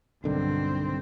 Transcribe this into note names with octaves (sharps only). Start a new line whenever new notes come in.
B1 G2 D3 D#3 C4